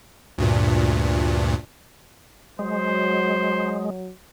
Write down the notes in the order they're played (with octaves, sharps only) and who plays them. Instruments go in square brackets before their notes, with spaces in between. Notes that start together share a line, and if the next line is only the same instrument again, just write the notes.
[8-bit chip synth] D2 G2 A#2
[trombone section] F#3 [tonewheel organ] G#3 [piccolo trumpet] C5